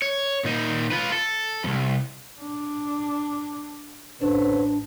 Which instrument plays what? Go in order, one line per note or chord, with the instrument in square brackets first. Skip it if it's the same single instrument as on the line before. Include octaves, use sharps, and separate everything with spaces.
[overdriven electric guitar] C#5
A#2 D#4
F4 B4
A4
C2 F2
[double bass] D4
[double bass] A1 [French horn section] D3 C#4 C5 [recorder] D4 [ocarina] B4